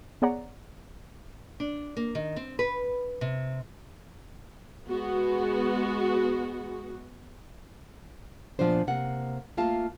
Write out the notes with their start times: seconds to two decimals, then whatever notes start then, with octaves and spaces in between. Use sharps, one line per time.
0.22 B3 G#4 C#5 D5 F#5 A#5
1.60 D4
1.97 A#3
2.15 D#3
2.36 C4
2.59 B4
3.21 C3
4.88 G#3 B3 F#4
8.59 A#2 C#3 F3 B3 D4 C5
8.87 C3 A#3 F#5
9.57 A3 A#3 F4 F5 A5